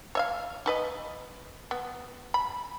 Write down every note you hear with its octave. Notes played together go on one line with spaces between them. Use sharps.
C#5 E5 F5
D#4 B4 D#5
B3
B5